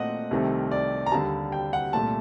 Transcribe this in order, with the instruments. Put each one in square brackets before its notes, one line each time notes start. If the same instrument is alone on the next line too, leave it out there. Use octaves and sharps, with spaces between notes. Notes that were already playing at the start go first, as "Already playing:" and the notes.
Already playing: [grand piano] A#2 A3 C4 D#5 F#5
C2 C3 D#3 A3 C4
D5
A#5
D#2 D3 G3 A5
G5
F#5
C2 A#2 A3 A5